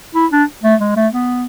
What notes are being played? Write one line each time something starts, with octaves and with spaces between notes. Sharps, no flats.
E4
D4
A3
G#3
A3
B3